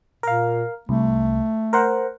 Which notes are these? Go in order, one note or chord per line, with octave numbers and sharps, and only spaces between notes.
A#2 A#4 F5
C2 A3
A#4 C5 F#5